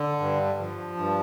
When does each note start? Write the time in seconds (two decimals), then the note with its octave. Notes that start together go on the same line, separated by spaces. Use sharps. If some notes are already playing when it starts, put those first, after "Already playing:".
Already playing: D3
0.20 G2
0.59 F3
0.97 G2